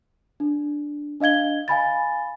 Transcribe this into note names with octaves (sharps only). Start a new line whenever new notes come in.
D4
D4 D#5 F5 G#6 G7
F5 G#5 B5 A6